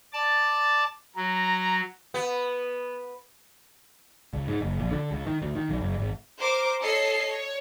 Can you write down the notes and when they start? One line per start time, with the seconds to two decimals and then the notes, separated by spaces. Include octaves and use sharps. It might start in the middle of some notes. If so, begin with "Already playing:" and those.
0.13 D5 A5
1.16 F#3 A#5
2.14 B3
4.33 C#2
4.48 G#2
4.61 F#1
4.79 A#1
4.91 D3
5.11 C#2
5.27 D#3
5.42 D2
5.55 D#3
5.69 B1
5.81 F#1
5.99 G#1
6.37 A#4 C5 D6
6.81 A4 C#5 D#5 C7
7.29 C#5